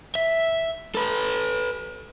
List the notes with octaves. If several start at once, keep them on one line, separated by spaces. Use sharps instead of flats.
E5
A4 B4